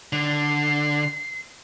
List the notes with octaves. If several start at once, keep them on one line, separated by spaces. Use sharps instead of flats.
D3 C7